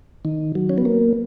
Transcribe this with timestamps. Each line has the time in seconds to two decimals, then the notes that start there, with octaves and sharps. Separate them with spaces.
0.25 D#3
0.55 F#3
0.69 C#4
0.78 B3
0.85 A#3